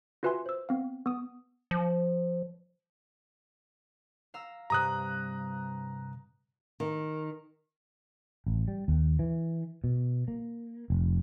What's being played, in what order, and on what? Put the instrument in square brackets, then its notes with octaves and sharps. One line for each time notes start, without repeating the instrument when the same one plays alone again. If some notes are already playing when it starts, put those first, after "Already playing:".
[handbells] F4 F#4 B4 E5 G#5 C6
C5 E6
B3 C4 F5
B3 D#6
[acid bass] F3
[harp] F5 A#5 E6
[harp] G2 C3 [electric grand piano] A#5 D#6 F#6
[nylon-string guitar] D#3
[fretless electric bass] A1
G3
D#2
E3
B2
A#3
F1